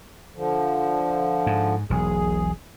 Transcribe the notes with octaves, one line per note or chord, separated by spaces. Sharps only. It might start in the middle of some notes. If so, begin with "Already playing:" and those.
D3 F3
G#2
E1 B1 G#4